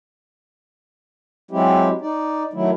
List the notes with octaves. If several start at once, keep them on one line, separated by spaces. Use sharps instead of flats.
F#3 G#3 C4 E4 G4
D#4 D5
D#3 F#3 A3 E4